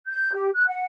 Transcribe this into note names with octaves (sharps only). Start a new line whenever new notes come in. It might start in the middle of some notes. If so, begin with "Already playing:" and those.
G6
G4
F#6
F#5